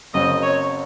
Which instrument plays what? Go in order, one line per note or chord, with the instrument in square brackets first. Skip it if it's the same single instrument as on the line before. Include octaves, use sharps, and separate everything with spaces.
[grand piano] F#1 F#2 C#3 F#3 C4 [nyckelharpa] D#5
[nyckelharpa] C#5